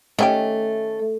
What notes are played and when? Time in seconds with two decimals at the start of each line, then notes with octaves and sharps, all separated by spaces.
0.19 D#3 A3 C#4 G4